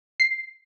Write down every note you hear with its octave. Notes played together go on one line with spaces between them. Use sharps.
C7